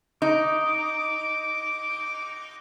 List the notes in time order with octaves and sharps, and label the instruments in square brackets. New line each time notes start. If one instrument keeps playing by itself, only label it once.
[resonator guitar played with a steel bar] D#4 [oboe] D6